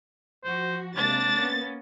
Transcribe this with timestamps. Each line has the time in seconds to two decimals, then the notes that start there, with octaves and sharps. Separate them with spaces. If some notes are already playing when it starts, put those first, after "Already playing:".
0.44 F3 F#4 C5
0.97 C3 G#3 A#3 D4 A6
1.37 A#3 B3 C#4